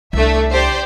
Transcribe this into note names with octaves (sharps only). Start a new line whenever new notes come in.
C2 A3 D4 E5
G4 C5 D5